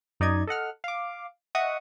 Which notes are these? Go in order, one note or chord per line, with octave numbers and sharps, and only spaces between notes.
F#2 D#4 D5 D#5 G#6
A4 D#5 F#5 F6
F5 D6
D#5 E5 F#5 C#6 D#6 F#6